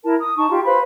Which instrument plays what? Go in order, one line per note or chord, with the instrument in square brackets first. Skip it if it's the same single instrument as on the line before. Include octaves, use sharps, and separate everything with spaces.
[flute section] E4 A#4 A5
D#6
D#4 A5 C#6
F4 G4
B4 C5 F5 B5